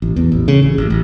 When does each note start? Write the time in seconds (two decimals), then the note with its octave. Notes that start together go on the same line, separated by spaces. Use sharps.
0.02 A1
0.16 E2
0.32 A1
0.48 C#3
0.63 A1
0.78 A1
0.90 A1